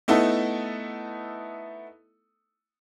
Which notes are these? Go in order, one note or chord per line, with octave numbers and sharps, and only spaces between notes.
A3 B3 D#4 E4 A4